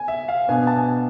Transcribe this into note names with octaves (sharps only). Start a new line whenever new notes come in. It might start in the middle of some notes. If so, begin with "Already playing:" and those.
Already playing: G#5
E5
F5
B2 B3 D4 G#5
A5
G#5